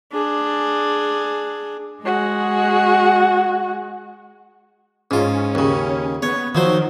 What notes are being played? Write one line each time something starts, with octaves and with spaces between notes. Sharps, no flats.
D4 G#4
G#3 F#4 G#4
G#2 C#4 F4
D#2 C#3
B3 C#5
D#3 F3 F#3 C5